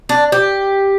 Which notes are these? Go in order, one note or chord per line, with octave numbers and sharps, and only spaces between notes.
D4
G4